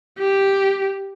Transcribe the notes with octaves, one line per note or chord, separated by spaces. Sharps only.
G4